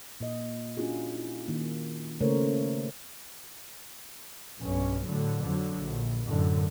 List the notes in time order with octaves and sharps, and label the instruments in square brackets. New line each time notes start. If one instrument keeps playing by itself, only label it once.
[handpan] A#2 D#5
C#4 D4 F4 F#4 G#4
E4
D#3 A#3
C#3 A3 A#3 A#4 C5 C#5
[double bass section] B1 G2 C#4
A2 D3 F#3
F2 D3 F#3
A#1
F#2 A2 D3